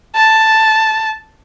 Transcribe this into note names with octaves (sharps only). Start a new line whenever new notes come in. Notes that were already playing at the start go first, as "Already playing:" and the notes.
A5